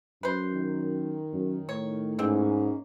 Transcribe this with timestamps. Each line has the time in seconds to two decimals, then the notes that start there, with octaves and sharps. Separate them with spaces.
0.23 F#2 B4 C5
0.54 D#3
1.33 F#2
1.69 A2 C#5
2.19 G#2 E3 A#3 C4 C#4